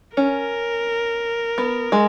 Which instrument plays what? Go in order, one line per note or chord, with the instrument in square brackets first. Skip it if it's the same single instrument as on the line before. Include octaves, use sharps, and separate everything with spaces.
[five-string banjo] C#4 [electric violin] A#4
[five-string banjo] B3
G#3